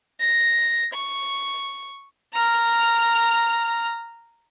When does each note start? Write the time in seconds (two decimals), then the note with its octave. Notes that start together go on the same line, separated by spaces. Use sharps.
0.21 A#6
0.94 C#6
2.34 A#5 F6